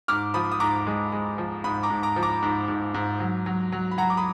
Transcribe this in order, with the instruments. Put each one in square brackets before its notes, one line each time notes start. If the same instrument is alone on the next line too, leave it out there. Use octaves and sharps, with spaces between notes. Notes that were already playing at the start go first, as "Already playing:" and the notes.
[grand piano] G#2 D6 F6
F3 B5 D#6
D#6
G#2 A#5 D6
G#3
G#3
F3
G#2 B5 D#6
A#5 D6
G#2
A#5 D6
F3
A#5 D6
G#2
G#2
G#2
F#3
F#3
F#3
B5
F#3 F#5 A#5
D6
B5 D#6